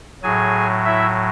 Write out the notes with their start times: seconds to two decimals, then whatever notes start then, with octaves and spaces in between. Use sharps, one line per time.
0.23 A2 F#3 G#4 G#5
0.85 E4 E5